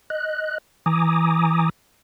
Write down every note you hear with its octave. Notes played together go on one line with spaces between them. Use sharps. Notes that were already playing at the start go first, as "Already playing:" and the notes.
D#5 F#6
E3 G#5 A#5 D6 D#6